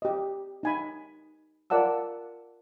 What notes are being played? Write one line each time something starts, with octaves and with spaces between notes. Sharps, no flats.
G4 D#5
D#4 G#5 B5
F4 A#4 D5 F#5 A5 E6